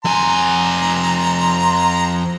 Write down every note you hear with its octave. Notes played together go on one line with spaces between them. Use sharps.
F2 G#5 A#5 C6